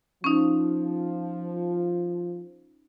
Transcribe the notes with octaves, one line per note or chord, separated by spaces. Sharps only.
F3 C#4 D#4